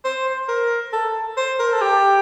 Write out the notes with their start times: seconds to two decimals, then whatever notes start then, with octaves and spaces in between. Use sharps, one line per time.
0.05 C5
0.49 A#4
0.93 A4
1.37 C5
1.59 A#4
1.73 A4
1.81 G4